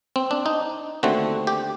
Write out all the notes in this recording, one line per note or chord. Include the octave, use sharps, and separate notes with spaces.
C4
D4
D#4
D#2 D3 A3 C4 F#4
G4